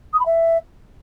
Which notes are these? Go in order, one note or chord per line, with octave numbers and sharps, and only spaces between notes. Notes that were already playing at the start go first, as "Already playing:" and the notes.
D#6
B5
E5